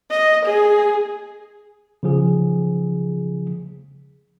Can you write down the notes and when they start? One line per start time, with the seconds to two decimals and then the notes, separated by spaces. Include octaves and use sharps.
0.11 D#5
0.46 G#4
2.03 C#3 F3 G#4